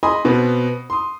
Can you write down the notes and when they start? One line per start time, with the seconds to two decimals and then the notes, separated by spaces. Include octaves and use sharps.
0.03 D#5 G#5 B5 C6 D#6
0.25 B2 B3 C4
0.90 C6 D#6